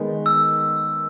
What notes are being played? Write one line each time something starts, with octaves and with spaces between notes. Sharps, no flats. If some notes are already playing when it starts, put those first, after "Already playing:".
Already playing: D#3 G#3 B3 D#4
E6